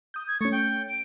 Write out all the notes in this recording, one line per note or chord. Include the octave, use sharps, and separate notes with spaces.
D#6 G6
G#6
A3 C#4 C#6
G5
D7